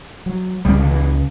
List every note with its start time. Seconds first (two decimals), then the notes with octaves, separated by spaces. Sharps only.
0.26 F#3
0.65 C#2 C#3 G3
0.80 D3
0.91 E3